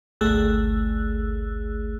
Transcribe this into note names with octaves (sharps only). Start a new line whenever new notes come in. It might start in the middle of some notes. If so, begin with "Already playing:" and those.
G#1 D2 A3 G#4 E6 F#6